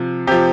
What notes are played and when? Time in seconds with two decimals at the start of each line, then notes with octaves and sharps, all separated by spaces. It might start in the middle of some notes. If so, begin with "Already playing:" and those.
Already playing: C3 F3
0.27 C3 F3 G4